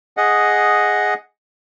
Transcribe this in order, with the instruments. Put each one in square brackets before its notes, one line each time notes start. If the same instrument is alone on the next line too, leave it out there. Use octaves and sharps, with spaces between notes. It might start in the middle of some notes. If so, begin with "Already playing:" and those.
[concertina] G#4 D#5 F#5